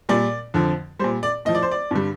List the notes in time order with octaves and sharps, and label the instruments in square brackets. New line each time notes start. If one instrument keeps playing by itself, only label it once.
[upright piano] A#2 G3 D5
F2 D3 F3
G3 C5
A#2
D5
A2 F3 D#5
D5
C5
D5
G2 D3 G3